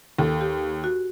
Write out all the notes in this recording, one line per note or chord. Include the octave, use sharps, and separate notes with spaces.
D#2 A4
G4
F#4